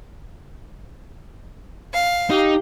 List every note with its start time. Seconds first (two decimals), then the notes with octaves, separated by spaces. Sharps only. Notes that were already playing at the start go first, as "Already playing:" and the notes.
1.93 F5
2.30 D#4 G4